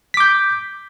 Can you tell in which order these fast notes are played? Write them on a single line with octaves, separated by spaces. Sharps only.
B6 D6 G6